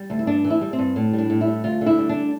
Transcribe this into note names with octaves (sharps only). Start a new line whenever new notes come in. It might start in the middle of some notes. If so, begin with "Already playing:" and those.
Already playing: G3
D2
E4
G2 D4
E3
E4
G3
C4
G2
A2
G3
D4
A2
E4
G3
D2 F4
D3
E4
G3
D4